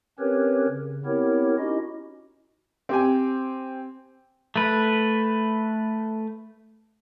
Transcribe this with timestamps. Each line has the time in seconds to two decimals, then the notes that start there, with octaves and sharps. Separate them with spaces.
0.19 C4 C#4 G4 A#4 B4 C#5
0.68 C#3
1.05 B3 C4 E4 G4 A#4 C#5
1.58 C#4 D#4 E4 F#4 G4 D#5
2.89 C4 G4 G#5
4.56 A3 B4